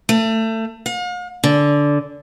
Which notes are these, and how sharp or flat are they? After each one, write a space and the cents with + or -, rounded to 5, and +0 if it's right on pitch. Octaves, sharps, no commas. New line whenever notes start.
A3 +25
F5 +45
D3 -10